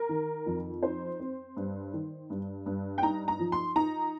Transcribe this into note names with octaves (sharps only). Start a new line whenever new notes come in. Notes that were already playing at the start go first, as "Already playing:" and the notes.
Already playing: A#4
D#3
F2
D#4 C5
C4
G2
D#3
G2
G2
G5
D#4 A#5
A#5
F3
C6
D#4 A#5